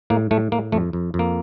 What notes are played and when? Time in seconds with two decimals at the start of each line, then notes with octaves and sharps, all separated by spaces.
0.10 A2 A#3
0.31 A2 A3
0.52 A2 A#3
0.72 F2 A3
0.93 F2
1.14 F2
1.19 A#3